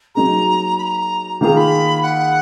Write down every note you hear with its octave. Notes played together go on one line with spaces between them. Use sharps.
F#3 A#3 D#4 G#4 A#5
B5
A#5
D#3 A#3 F4 G#4 A#5
B5
F#5